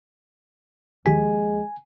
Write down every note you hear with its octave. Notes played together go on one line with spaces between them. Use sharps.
D#2 D#3 F3 G#3 G4 G#5 B6